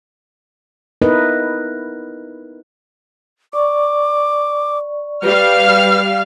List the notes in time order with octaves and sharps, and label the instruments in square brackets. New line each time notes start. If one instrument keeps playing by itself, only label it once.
[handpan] B3 D#4 E4 A#4 B4 D#5
[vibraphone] D5 C#6 [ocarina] D6
[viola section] G3 F5 [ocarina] B4 [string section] F6